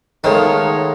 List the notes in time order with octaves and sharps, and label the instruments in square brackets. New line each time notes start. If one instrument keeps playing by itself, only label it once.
[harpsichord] D#3 [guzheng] G#3 A3 [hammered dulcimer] B3 D#4 F5 [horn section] A4 C#5